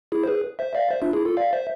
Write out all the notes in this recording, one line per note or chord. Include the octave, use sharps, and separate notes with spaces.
E4 G#4
C5
G#4 B4
C5 E5
D5 F5
C5 E5
D4 F4
E4 G#4
F4 A4
D5 F5
C5 E5